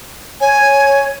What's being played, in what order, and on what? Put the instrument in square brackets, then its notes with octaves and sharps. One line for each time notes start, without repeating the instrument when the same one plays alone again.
[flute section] C#5 [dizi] G#5